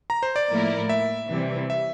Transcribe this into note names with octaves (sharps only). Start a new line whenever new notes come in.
A#5
C5
D5
A2 F3 A#3 E4 A#4
E5
C3 E3 G3
E5